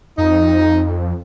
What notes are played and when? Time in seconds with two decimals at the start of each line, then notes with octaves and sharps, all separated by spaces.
0.18 F2 D#4